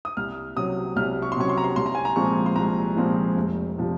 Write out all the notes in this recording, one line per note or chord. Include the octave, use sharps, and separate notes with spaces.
D#6
C2 F6
C3 F#3 C#4 D#6
C2 F6
C#6
C6
C3 F#3 C#4 C#6
C6
A#5
C6
C2 C6
A#5
G#5
A#5
A#2 F3 G#3 C4 C#6
C6
C2 A#5
A#2 F3 G#3 C4
F1
C3 F3